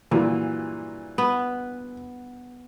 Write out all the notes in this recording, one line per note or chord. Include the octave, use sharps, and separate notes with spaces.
G2 A#2 E3 F#3
B3